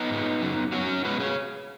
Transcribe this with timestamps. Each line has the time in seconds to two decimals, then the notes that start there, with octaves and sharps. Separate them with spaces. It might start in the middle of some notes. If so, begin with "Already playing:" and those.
Already playing: B3 D#4
0.10 G#2 G#3
0.42 F#2 C#3 F#3
0.72 F#2 F#3 C#4 F#4
1.05 B2 G#3 F#4 B4
1.20 G#4 C#5